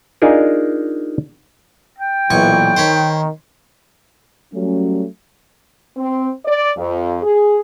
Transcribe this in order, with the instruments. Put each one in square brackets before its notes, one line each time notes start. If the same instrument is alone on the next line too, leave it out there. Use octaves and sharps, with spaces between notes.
[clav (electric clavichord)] D4 D#4 F4 G#4 A#4
[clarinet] G5
[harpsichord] B1 G#5 C#6 [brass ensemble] A#2 E3
[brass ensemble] D#3 [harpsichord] C5 C#5 B5
[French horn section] F#3 G3 A3 C#4
C4
D5
F2
G#4